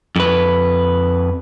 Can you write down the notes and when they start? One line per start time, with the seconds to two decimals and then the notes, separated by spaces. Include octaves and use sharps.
0.16 F2 B4